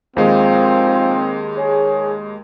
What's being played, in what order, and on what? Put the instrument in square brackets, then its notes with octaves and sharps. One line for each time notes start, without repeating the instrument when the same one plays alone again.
[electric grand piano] D#2 G#3 [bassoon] F3 [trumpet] C4
[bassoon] C#4 [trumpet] G#4